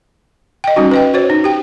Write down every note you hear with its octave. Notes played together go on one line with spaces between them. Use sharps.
D#5 G5
G3 C#4 D#4 F#4
B4 D#5 G5
F#4 C5 C#5
D#4
G4 G5